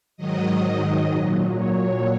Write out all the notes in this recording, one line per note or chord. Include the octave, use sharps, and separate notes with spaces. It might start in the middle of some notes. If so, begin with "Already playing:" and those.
G#2 D#3 F#3 D#5
A#2 F#3
C#5